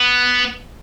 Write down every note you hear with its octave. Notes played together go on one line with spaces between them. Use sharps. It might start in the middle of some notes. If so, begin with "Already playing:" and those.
Already playing: B3